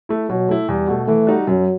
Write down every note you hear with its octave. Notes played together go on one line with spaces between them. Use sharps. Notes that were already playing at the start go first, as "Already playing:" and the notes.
A3 E4
B2 F#3
A3 E4
E2 G3
B2 A3
E3 A3
G3 D#4 F#4
F#2 F#3